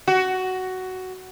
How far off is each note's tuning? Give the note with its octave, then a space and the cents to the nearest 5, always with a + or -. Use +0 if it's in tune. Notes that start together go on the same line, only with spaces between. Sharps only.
F#4 +10